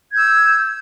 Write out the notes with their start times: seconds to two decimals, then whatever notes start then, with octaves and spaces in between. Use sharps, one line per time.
0.10 G#6
0.14 G6
0.17 E6